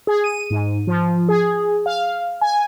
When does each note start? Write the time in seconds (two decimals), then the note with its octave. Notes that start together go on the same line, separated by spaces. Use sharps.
0.07 G#4
0.24 D#7
0.50 G#2
0.87 F3
1.29 G#4
1.86 F5
2.41 G#5